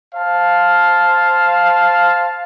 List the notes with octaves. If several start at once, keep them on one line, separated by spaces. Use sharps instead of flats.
C5 F5 A5